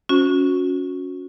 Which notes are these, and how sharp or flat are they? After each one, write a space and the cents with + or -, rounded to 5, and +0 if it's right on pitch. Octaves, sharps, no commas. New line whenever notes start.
C#4 +5 F#4 -25 C5 +0